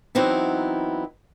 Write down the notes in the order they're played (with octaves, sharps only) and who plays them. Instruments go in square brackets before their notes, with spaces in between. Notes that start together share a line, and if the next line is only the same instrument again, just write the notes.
[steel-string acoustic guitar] E3 F#3 B3 C4 D#4 E4